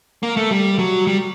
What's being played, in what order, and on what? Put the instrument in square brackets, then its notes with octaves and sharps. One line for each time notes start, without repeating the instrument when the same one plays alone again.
[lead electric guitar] A#3
A3
G3
F#3
G3